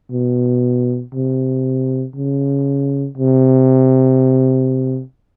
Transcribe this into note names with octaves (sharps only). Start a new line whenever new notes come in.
B2
C3
C#3
C3